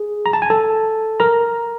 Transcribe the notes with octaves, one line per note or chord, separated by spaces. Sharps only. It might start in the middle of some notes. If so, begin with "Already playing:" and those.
Already playing: G#4
A#5
A5
G#5
A4 A5
A#4 A#5